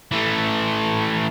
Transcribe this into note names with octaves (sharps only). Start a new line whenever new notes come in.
E3 A3